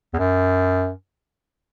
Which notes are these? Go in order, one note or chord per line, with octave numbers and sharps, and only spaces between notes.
E2
F#2